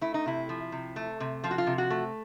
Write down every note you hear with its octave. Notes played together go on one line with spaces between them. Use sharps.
A3 E4
D#4
C3 E4
F3
C3
A3
C3
F3 F4
F#4
F4
C3
F#4
A3